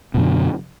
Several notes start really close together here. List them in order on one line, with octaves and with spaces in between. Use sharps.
B2 F#2 D3